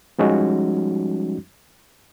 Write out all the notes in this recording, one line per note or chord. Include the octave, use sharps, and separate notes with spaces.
F3 G3 G#3 C#4 D#4 F#4